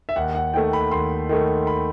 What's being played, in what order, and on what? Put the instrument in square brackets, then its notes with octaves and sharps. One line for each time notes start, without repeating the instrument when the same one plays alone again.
[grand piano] E5
D#2 F#5
F#5
D#3 A3 G5
B5
D#2 C6
D#3 A3
B5